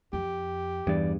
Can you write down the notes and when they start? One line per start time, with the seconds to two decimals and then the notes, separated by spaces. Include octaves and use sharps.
0.13 F2 G4
0.87 E2 G2 E3 D5